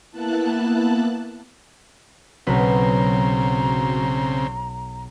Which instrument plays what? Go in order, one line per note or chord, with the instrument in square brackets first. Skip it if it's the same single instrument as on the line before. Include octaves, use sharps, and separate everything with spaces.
[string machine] A#3 B3 E4 A5 F#6
[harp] B1 B4 [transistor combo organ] C#3 C4 [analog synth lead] F#3 [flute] A#5